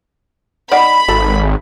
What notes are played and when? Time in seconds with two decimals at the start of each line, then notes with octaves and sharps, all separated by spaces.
0.72 D#3 D5 F#5 B5
1.08 G#1 A4